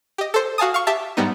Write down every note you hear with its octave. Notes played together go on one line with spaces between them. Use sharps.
G4 D#5
A4 C5
F#4 F5 G#5 A5 D#6
F5 C#6
G4 E5 A5
G#2 G3 B3 D#4